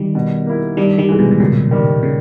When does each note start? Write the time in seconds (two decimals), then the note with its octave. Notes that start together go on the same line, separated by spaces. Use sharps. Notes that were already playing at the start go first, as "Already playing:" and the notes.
Already playing: D#3 G3
0.15 B2
0.46 A#3 E4
0.77 G2 D#3 G3
0.98 D#3 G3
1.09 E3 G#3
1.19 G#2 B2
1.31 B2
1.40 D#2 A#2 C#3
1.71 D#3 G3
2.03 A#2 C#3